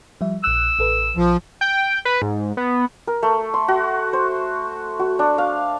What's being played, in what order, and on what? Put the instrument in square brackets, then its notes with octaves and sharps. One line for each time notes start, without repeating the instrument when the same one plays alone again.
[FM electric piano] F3 G3 E5
[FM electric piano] A#1 F#6 [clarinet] E6
[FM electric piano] A1 A4 B4
[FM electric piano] A#1 [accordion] F3
[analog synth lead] G5
B4
G#2
B3
[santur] A#4
A3
C6
F#4
C5
F#4
D4
F5